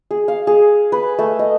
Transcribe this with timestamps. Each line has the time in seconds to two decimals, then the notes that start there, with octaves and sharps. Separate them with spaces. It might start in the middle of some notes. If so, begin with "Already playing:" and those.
0.11 G#4
0.28 F5
0.47 G#4
0.92 B4
1.19 A3
1.39 D#5